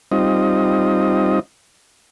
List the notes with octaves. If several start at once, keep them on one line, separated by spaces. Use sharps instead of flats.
G3 C4 D#4 F4 D#5